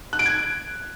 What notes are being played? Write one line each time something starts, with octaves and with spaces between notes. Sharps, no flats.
F#6
D7
G#6